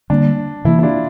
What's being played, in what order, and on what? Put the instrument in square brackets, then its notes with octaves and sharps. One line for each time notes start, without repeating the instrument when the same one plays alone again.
[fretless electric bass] D3 G3 A#3 [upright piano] D4
[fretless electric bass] C3 E3 A#3 [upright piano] E4
[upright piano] E4
D4 F4